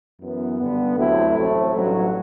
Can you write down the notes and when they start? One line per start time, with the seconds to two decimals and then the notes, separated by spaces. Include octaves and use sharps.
0.20 F#2 E3 B3
0.58 G2 D3 G3 B3
0.96 D2 C3 F#3 A3 E4
1.34 A1 A2 F#3 A3 C4
1.73 A1 G2 F#3